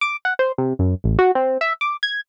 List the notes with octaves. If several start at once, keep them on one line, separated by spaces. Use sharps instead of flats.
D6
F#5
C5
C3
F#2
A1
F#4
C4
E5
D6
G#6